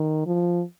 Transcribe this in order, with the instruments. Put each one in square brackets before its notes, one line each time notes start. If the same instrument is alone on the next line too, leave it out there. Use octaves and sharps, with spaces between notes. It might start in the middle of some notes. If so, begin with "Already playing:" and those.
Already playing: [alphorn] D#3
F3